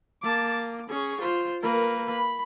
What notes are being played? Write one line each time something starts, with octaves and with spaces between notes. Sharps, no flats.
A#3 A5 D6
D6
C#4 G#4 C#5
F4 C5
A#3 A#4 B4
B5